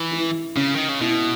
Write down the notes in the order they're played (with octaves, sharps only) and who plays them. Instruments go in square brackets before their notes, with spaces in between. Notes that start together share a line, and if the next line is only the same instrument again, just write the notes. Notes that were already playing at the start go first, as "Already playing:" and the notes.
Already playing: [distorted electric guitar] E3 [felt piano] E4
[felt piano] E4
[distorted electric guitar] C#3 [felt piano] C#4
[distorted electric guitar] D#3
C#3
[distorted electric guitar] B2 [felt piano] E4